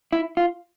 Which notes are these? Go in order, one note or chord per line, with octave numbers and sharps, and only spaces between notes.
E4
F4